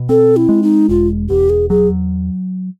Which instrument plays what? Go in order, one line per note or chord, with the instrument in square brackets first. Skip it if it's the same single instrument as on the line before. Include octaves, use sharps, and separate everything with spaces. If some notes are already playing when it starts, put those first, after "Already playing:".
Already playing: [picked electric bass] B2
[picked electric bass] C4 [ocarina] A4
[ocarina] E4
[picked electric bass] G#3
[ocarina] D#4
[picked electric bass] E1 [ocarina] F4
[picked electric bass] E2 [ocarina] G4
[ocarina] G#4
[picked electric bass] F#3 [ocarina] G#4